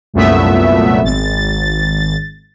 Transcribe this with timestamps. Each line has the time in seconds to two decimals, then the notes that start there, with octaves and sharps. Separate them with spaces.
0.13 C2 F#2 A#2 A3 B3 E5
1.03 G#1 A6